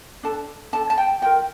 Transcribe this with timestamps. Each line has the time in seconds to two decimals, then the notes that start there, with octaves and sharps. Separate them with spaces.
0.23 D4 A4 A5
0.73 D4 A4 A5
0.90 A5
0.98 G5
1.22 F4 A#4 G5